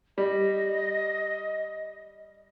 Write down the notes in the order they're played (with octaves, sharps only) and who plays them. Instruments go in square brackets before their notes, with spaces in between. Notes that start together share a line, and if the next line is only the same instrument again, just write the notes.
[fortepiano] G3 [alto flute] D#5